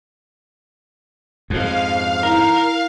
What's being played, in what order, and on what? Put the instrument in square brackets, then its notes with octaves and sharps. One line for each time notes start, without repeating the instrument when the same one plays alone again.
[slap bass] F2 G#2 [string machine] F5
[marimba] D#4 E4 [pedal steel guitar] A#4